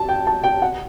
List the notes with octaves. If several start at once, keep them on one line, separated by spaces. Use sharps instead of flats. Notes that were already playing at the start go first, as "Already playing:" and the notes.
Already playing: A5
G5
A5
G5
F#5